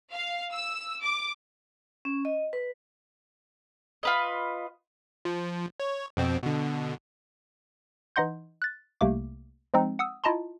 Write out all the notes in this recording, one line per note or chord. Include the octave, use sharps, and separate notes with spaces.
F5
E6
D6
C#4
D#5
B4
F4 B4 D#5
F3
C#5
F2 B2 C4
B2 D3
E3 D#4 D#5 F#5 C6 G6
F#6 A6
C2 C3 A3 A#3 D6
F3 G#3 C4 D#4
F#5 D#6 E6
E4 F4 D#5 A5 A#5 C6